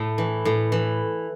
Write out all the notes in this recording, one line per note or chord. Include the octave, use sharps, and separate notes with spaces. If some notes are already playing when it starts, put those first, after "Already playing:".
Already playing: A2 A3
E3
A2
E3